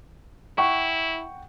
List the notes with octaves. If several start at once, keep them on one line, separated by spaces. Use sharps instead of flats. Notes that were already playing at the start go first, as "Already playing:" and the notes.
E4 F#5 G5 C#6